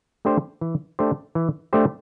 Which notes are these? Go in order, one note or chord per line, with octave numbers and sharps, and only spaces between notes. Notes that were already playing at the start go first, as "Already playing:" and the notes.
A3 D4 G4 C5
E3
A3 D4 G4 C5
E3
A3 D4 G4 C5